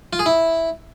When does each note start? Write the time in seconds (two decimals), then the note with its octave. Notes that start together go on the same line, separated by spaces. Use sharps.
0.13 F4
0.19 G#4
0.26 E4